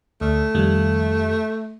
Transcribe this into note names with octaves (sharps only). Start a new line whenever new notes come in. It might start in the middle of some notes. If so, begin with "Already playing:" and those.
D2 A3
F2 D#3 G3